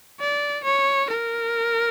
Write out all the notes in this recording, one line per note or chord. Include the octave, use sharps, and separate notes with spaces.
D5
C#5
A#4